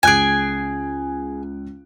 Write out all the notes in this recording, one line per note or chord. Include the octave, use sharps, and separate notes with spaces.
C#2 G#4 G#5 F#6 D7